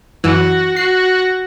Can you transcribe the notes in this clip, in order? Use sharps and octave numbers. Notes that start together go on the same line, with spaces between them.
F#2 E3 F#4
F#4 C7